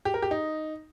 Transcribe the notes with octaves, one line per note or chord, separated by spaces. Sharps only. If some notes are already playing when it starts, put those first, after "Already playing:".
G4
A#4
G4
D#4